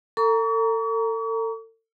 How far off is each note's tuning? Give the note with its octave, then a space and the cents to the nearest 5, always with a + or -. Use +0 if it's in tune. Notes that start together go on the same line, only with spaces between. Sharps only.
A4 +35 A#5 +5 C#6 +40